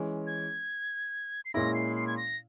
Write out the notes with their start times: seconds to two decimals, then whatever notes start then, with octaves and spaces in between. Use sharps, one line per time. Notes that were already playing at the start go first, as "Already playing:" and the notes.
Already playing: E3 G#3 C#4
0.27 G#6
1.45 C7
1.54 A#2 G#3 C#4 E4 A#6
1.75 C7
1.96 C7
2.07 G#6
2.17 A#6